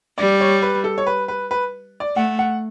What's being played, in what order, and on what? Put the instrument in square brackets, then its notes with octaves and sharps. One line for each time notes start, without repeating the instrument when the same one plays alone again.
[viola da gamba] G3 [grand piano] D5
[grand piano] C#5
B4
A4
C#5
B4
B4
B4
D5
[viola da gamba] A3 [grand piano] F#5
[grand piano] F#5